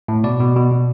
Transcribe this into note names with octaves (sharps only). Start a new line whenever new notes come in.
A2
B2 D5
B2
B2
B2